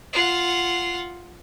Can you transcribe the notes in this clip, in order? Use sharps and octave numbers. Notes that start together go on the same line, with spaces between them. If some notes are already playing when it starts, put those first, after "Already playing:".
F4 F#5